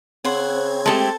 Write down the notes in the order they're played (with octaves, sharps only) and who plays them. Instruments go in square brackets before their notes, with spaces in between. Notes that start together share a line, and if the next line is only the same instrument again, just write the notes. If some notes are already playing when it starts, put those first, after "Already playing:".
[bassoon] C#3 [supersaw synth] C4 G#6 [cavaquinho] F#5 C6
[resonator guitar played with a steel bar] G#3 A3 G4 [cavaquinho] A4 A5